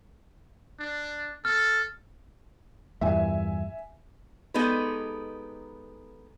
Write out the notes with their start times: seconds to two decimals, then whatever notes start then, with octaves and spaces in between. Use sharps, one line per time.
0.80 D4
1.45 A4 F6
3.01 E2 G2 A#2 E5 G#5
4.54 G#3 B3 D#4 G4 A4 B4